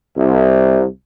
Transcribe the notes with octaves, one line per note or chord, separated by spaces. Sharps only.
C2